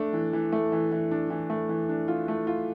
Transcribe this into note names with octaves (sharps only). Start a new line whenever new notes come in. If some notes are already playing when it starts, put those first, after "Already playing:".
Already playing: A3 D4
E3
E3
A3
E3
E3
D4
E3
A3
E3
D4
F4
A3
F4